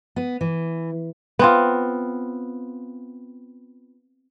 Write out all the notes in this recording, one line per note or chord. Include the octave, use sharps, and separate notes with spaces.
B3
E3
B3 C4 F4